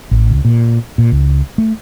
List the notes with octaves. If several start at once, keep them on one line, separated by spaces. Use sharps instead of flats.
A1
C#2
A#2
A#2
C#2
A3